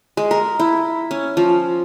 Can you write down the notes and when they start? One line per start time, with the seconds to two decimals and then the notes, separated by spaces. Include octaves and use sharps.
0.17 G#3
0.31 A#4
0.60 E4
1.11 C#4
1.37 F3